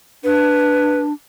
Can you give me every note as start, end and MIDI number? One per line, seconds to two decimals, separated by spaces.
0.24 1.13 62
0.24 1.01 71